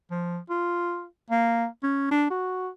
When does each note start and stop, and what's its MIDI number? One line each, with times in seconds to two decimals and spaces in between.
0.11 0.38 53
0.50 1.05 65
1.31 1.67 58
1.83 2.06 61
2.11 2.26 62
2.31 2.69 66